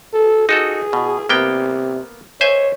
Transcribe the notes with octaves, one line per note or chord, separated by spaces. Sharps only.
A4
D#4 F#4 G#4 A4
B2
C3 A#3 B3 G5
C5 C#5 E5 G#5